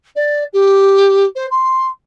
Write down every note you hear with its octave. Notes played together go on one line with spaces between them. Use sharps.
D5
G4
C5
C6